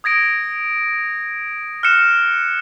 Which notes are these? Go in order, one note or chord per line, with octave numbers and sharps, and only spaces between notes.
D#6 G#6 A#6 D7
F6 F#6 C#7 E7